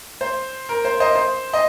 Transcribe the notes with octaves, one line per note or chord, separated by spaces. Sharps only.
C5
A#4
C5
C5 D#5
C5
D#5